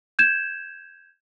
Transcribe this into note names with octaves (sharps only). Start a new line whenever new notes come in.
G6 G#6 E7